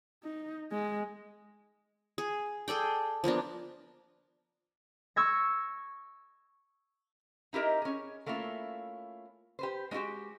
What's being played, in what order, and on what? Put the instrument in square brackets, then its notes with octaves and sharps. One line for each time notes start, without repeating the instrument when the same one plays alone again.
[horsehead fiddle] D#4
G#3
[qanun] G#4
G#4 A4 D5 G5
F3 A#3 B3 D4
[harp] C#6 E6 G#6 A#6
[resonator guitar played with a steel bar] D#4 E4 G4 A#4 D#5
C#4 G#4
A3 A#3 C#4 E4 F4
G4 B4 C5
G#3 C4 E4 F#4 G4